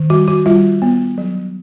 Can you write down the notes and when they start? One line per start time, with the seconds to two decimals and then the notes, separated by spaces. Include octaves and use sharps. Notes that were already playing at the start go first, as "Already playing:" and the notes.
Already playing: D#3
0.10 G3 F#4
0.28 F#4
0.46 G3 F4
0.82 B3
1.18 F#3